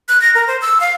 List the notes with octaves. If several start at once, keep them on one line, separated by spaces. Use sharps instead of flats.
F#6
A#6
A#4
C5
E6
F5